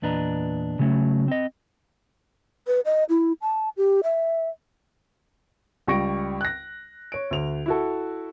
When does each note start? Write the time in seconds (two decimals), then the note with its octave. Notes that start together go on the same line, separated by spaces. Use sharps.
0.02 E2 A#2 D4 B4 D#5 A#5
0.79 C#3 F#3 A3 C#4
1.28 C4 D#5
2.67 B4
2.85 D#5
3.09 E4
3.42 A5
3.77 G4
4.03 E5
5.87 C#2 G3 C#6 A#6 D7
6.41 F#6 A#6
7.12 C#5 D7
7.31 D2 F7
7.66 E4 F#4 A4